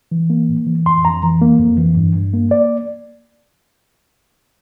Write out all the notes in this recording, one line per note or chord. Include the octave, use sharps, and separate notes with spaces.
E3
A#3
A2
E3
F2 C6
F2 A#5
E3
A#3
F2
E3
G2
G2
A#3
D5